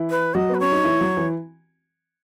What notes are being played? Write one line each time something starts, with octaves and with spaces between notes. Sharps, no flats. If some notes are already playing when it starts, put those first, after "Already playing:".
Already playing: E3 E4
B4
F#3 F#4 D#5
B3
B4
C#4 C#5
D#4
E3 E4
F#3 F#4
E3